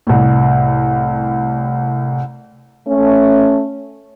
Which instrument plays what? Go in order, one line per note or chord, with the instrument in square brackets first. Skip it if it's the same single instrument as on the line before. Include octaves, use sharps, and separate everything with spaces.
[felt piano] C2 A2
[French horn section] A3 C#4